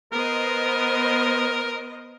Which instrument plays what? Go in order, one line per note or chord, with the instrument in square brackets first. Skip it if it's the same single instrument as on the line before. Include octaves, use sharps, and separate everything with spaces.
[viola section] B3 C5 D#5 [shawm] A#4